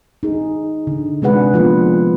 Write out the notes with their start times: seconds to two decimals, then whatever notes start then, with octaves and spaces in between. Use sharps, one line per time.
0.23 D#4 G#4
0.87 D3
1.22 C3 G#3 D4 G#4 B4 F#5
1.54 F3 A#3 B3 F4 B4